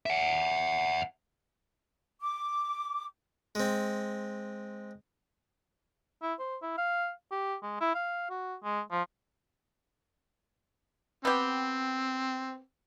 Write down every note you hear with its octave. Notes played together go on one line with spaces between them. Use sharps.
E5 F#5
D6
G#3 C4
E4
C5
E4
F5
G4
G#3
E4
F5
F#4
G#3
F3
B3 C4 G4